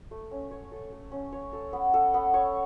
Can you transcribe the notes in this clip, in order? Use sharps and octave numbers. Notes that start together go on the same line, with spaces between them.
A3
C#4
C#5
A4
A3
C#4
C#5
A4
B3
A4
B3
C#5